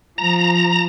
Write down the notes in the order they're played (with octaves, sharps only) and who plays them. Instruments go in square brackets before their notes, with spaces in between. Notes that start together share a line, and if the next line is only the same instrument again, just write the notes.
[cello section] F3 [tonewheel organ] A#5